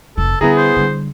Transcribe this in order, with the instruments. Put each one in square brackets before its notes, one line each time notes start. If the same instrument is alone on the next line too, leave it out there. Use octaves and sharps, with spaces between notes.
[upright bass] F1 E3 [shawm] A4
[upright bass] D3 G3 [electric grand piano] B3 E4 G#4 [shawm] A#5
[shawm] C5
[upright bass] D3 G3